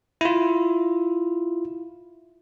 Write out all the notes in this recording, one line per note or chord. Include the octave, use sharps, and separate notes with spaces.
E4 F4